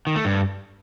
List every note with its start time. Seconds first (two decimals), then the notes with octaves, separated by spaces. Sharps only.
0.07 D#3
0.16 A3
0.25 G2